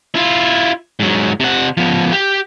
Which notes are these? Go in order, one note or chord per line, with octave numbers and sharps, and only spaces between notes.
E4 F4
G#2 F#3
C3 F#5
F3 B3
G4